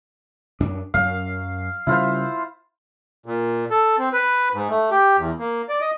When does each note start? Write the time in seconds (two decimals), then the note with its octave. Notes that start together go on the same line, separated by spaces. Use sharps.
0.60 F#2 D4
0.94 F#2 F#3 F5
1.87 C#3 G3 E4 F4 C5
3.26 A#2
3.71 A4
3.98 C4
4.13 B4
4.54 G#2
4.70 A3
4.91 G4
5.17 E2
5.39 A#3
5.69 D5
5.81 D#5